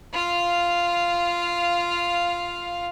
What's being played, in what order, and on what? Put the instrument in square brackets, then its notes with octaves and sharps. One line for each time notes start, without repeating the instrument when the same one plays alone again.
[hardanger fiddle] F4 F5